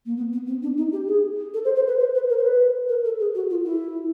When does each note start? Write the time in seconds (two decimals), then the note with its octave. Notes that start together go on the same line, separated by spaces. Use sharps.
0.06 A#3
0.17 B3
0.33 B3
0.47 C4
0.62 D4
0.77 D#4
0.92 G4
1.08 G#4
1.54 A4
1.65 C5
1.76 C5
1.87 B4
1.99 C5
2.14 B4
2.29 A#4
2.38 C5
2.44 B4
2.89 A#4
3.05 A4
3.19 G#4
3.35 F#4
3.50 F4
3.65 E4